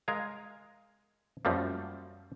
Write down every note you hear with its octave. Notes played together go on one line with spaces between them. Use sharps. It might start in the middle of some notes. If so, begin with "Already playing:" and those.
G#3 A#4 F5 G#5
F#2 F3 G3 A3 A#3